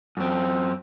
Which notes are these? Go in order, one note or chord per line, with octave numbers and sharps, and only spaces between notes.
F#2 C4